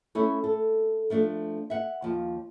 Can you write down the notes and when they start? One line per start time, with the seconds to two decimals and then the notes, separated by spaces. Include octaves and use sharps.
0.15 A3 C#4 E4
0.44 A4
1.10 F3 A3 D4
1.70 E5 F#5
2.02 D#2 F3